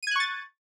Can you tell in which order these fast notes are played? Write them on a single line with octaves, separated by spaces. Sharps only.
D#7 G#6 F#6 C#6 A6